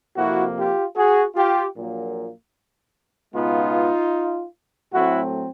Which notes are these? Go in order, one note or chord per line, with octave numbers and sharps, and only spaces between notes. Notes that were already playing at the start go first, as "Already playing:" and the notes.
F2 C3 F3 A#3 E4 F#4
F4 G4
F#4 G#4
F4 G4
A#1 A#2 F#3 A#3
C#2 B2 G#3 B3 D#4 F4
A2 F#3 A3 C4 E4 F#4